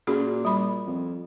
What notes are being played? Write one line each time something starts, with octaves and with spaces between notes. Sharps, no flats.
A#2 C#4 F#4 G#4
G3 B5
F2